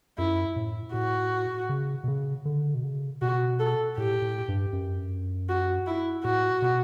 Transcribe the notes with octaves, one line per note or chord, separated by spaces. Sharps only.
F#2 E4
A2
A2 F#4
C#3
B2
C#3
D3
B2
C#3
B2 F#4
A4
A2 G4
A2
G2
F#2
F#4
E4
A2 F#4
B2